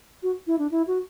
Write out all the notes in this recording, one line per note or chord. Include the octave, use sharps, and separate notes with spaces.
F#4
E4
D4
E4
F#4